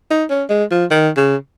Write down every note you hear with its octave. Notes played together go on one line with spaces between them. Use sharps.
D#4
C#4
G#3
F3
D#3
C#3